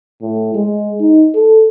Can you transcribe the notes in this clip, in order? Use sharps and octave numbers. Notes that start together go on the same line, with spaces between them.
A2
G#3
D#4
A4